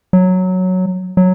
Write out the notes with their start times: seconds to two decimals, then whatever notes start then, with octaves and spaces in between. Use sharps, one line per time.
0.13 F#3
1.17 F#3